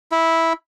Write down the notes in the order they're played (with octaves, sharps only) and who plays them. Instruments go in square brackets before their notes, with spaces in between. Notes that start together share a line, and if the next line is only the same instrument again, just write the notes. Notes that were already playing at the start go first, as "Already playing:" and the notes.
[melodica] E4